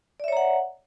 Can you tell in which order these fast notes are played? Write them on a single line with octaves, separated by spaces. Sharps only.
D5 E5 C#5 A#5 F#5